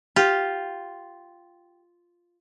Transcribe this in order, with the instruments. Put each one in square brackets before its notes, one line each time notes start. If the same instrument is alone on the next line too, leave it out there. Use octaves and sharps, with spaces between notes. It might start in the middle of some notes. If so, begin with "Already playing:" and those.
[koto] F4 [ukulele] G4